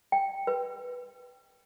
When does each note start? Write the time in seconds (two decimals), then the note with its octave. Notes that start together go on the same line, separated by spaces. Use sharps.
0.12 G5
0.47 B4